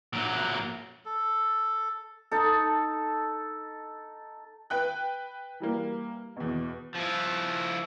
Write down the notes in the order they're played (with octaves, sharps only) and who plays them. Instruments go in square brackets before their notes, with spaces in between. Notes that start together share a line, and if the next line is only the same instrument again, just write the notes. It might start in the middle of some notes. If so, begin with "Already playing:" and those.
[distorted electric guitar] A#2 F#3
[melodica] A4
[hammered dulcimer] D#4 A4
[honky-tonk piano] B4 G5 F#6
E3 G3 A#3
E2 B2
[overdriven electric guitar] F3 E4